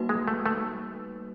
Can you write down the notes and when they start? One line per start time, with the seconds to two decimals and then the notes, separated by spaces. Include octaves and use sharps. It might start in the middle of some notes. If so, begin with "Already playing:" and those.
Already playing: G3 A#3 D#4 F#4 B4
0.09 G#3
0.28 A3
0.46 A3